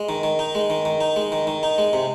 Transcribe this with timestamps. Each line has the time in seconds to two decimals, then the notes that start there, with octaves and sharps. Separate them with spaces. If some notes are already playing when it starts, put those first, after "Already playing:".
Already playing: G#3
0.09 D#3
0.23 D#3
0.39 D#4
0.55 G#3
0.70 D#3
0.85 D#3
1.01 D#4
1.16 G#3
1.32 D#3
1.47 D#3
1.63 D#4
1.78 G#3
1.93 C3